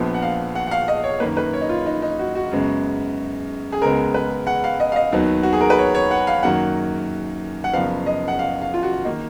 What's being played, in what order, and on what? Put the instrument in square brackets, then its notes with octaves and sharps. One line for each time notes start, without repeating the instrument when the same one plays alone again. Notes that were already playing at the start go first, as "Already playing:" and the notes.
Already playing: [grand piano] A#1 A#2 F3 B3
F#5
F5
F#5
F#5
F5
D#5
C#5
F#2 D#3 A#3 B4
B4
C#5
D#4
F4
D#4
D#4
F#4
F#4
F#2 C#3 G#3 B3
G#4
C#2 C#3 G#3 B3 A#4
B4
F#5
F5
D#5
F5
D#5
D#2 D#3 F#3 B3
F#4
G#4
A#4
B4
C#5
C#5
F#5
F5
F#2 D#3 F#3 A#3 F#5
F#5
F#1 F#2 F3 B3 F5
D#5
F#5
F5
F5
F4
F#4
D#3 A#3 D#4